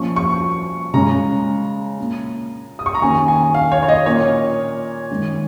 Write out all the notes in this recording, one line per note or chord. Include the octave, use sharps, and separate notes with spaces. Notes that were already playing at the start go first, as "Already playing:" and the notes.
Already playing: A#2 F3 C#4 C#6
C#6
C#3 G#3 C#4 A#5
A#2 A#3 C#4
D#6
C#6
A#5
D#3 A#3 C#4 G#5
G#5
F5
C#5
C#5
D#5
A#2 A#3 C#4 C#5
D#3 G#3 C#4